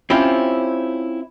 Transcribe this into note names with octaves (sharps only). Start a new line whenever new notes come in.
C4 C#4 E4 F4 G4